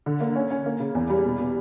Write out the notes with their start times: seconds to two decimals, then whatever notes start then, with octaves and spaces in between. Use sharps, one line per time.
0.06 D3
0.20 A#3
0.36 C#4
0.51 C#4
0.66 A#3
0.80 C#3
0.95 E2
1.10 G3
1.25 B2
1.39 B2